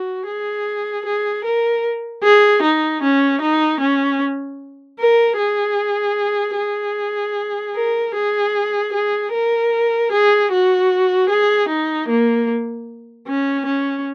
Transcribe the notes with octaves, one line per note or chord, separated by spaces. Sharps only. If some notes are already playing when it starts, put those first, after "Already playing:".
Already playing: F#4
G#4
G#4
A#4
G#4
D#4
C#4
D#4
C#4
A#4
G#4
G#4
A#4
G#4
G#4
A#4
G#4
F#4
G#4
D#4
A#3
C#4
C#4